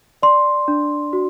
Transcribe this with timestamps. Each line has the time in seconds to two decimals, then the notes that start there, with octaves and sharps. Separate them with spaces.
0.23 D5 C6
0.68 D4
1.13 F#4